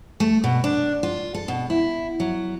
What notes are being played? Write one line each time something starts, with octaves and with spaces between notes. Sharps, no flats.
A3
B2
D4
F4
A4
B2
E4
F#3